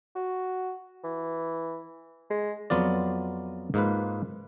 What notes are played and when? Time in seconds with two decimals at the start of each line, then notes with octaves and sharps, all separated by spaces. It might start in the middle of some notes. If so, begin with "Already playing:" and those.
0.16 F#4
1.04 E3
2.30 G#3
2.70 F2 F#3 B3 F4 D5
3.74 G#2 A#3 F4 B4